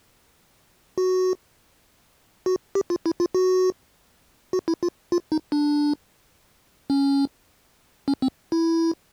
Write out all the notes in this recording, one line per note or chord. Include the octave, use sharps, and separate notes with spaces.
F#4
F#4
G4
F4
E4
F4
F#4
F#4
E4
F4
F4
D#4
D4
C#4
C#4
C4
E4